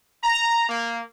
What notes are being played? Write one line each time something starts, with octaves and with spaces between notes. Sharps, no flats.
A#5
A#3